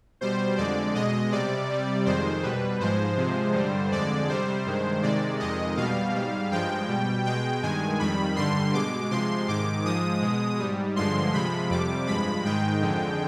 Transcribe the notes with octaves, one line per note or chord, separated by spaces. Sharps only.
B2 G3 C5
F2 D3 G#3 D5
B2 G#3 D#5
C3 G3 D5
C3 G3
F2 D#3 G#3 C5
B2 G3 B4
G#2 F3 G#3 C5
C3 F3 G#3
G2 D3 G3
F2 D3 G#3 D5
C3 G3 C5
G2 D#3 G#3
C3 D#3 G#3 D5
F2 D#3 G#3 D#5
B2 G3 F5
G#2 G3
G2 F3 G#3 G5
B2 G3
B2 G#3 G5
G2 D#3 G#3 G#5
F2 D#3 G3 B5
G2 D3 G3 C6
B2 G#3 D6
C3 F3 G#3 C6
G#2 D#3 G#3 D6
G#2 F3 G#3 D#6
B2 G#3
G#2 G3
G2 D3 F3 G#3 C6
C3 F3 G#3 B5
F2 C3 G3 D6
G2 F3 G#3 B5
G#2 D#3 G#3 G5
F2 D3 G#3